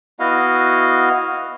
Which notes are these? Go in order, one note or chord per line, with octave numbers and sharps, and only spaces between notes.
B3 E4 F#4 D#5 F5